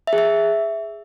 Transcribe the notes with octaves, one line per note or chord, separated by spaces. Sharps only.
E5
G#4
E5